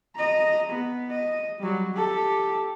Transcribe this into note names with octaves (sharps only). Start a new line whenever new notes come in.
D#5 A#5
B3
D#5
F#3 G3
G4 A4